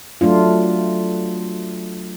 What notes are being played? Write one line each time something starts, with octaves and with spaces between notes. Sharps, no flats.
F#3 A3 D4 F4